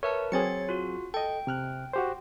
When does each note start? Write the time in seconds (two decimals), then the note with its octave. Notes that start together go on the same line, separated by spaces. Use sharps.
0.03 A#4 B4 C#5 E5 A5
0.32 F#3 C4 G#4 C#5 A6 C#7
0.69 F4 F#4
1.14 A4 D#5 G5
1.47 C3 F6 F#6
1.93 F#4 G4 C5